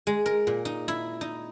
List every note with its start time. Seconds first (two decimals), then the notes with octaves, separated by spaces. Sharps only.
0.07 G#3
0.26 A#4
0.47 A#2
0.65 D#4
0.88 E4
1.21 D#4